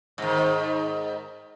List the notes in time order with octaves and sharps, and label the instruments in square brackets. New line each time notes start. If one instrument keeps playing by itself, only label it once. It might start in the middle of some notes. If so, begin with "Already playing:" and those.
[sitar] G#2 D#3